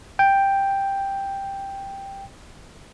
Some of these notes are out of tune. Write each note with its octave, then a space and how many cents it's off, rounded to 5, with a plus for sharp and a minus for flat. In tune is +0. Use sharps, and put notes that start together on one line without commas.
G5 +5